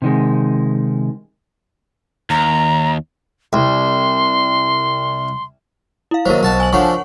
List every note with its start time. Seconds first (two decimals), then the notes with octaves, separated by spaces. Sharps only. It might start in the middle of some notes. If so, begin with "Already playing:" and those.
0.02 C3 D#3 G#3
2.30 D#2 A#5
3.53 C2 C6
6.11 E4 F5
6.26 D#2 F#3 A#4 C5
6.41 B1 F#4 A5
6.60 G#5 F#7
6.73 D3 F3 C#5 F#5 C#6